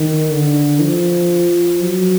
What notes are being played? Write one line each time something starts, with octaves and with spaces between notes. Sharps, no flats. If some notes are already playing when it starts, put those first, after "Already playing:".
Already playing: D#3
D3
F3
F#3